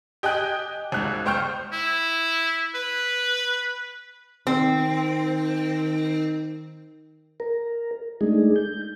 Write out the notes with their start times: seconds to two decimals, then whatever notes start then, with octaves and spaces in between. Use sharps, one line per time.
0.23 G4 D#5 G5 G#5 F#6
0.92 G#1 C#2 F#6
1.26 C#2 C5 G5 C#6 F6 G6
1.72 E4
2.75 B4
4.47 D#3 C4
7.40 A#4
8.21 G#3 A3 D4 D#4 G#4
8.56 G6